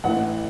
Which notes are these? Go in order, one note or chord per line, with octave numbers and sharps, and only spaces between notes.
A1 A2 E3 F#5